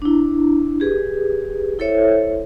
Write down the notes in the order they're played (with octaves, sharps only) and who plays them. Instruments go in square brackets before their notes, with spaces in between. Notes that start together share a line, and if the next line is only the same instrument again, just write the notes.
[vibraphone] D4 E4
G4 G#4 B4
E4 A4 C5 C#5 E5